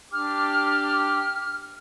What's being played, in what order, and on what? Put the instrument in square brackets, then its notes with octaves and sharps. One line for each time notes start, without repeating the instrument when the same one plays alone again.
[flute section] D4 D6 [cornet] G4 [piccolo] F6